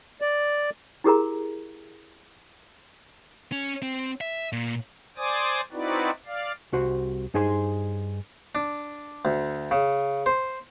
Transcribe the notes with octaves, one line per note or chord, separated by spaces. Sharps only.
D5
E4 G4 G#4 A#4 A#5
C#4
C4
E5
A#2
C5 D5 G#5 D6 D#6
C4 D#4 E4 F#4 B4 D5
D5 F5
C2 F#4 C5
G2 D#4 G#4 C5 B5 C6
D4
D2
C#3
C5